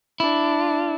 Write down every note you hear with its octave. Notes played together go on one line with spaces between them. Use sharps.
D4 E4